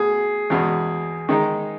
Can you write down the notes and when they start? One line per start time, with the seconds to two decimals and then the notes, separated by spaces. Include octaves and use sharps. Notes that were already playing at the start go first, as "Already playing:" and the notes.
Already playing: B2 A3 G#4
0.50 E2 B2 G#3
1.29 D#3 G#3 D#4